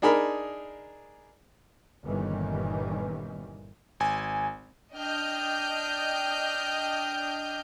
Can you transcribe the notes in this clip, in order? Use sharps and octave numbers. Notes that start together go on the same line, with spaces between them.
D4 D#4 G#4 A#4 B5
G1 A#2 D#3 E3 G3 C#4
G#1 G#5
D4 D#5 G5 F6 G6